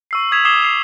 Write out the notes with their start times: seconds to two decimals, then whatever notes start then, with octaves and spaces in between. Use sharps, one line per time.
0.11 C#6 E6 C7
0.32 D#6 E6 G#6 B6 E7 F7
0.45 D6 D#6 C7 E7 F7 G7
0.62 C7 F7